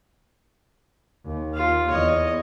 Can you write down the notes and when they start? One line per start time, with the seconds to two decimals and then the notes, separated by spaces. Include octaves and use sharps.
1.25 D#2
1.54 F4 F5
1.90 E2 C#5 D#5